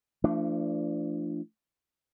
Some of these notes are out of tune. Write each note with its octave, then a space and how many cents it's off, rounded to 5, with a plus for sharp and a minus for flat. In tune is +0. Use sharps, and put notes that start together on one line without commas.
F3 -35 A3 +30 D4 +0